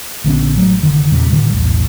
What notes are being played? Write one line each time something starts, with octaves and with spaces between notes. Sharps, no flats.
A#1 D3 B3 C#4
A1 F#3 A3
F1 D3 D#3
E2 A#2 C#3 G3
A2 D3 D#3 G3
B1 E2 A2